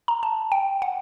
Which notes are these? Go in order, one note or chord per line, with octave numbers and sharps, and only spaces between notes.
A#5
A5
G5
F#5